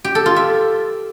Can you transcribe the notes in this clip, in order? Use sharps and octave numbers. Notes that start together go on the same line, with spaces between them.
G4
A4
F4
E5